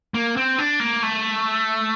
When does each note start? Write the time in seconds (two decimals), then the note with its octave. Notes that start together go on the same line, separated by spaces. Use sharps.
0.14 A#3
0.37 C4
0.58 D4
0.80 A#3
1.03 A3